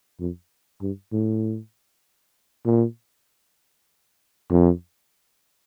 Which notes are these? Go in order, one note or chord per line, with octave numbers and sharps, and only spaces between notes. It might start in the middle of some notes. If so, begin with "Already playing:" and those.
F2
G2
A2
A#2
F2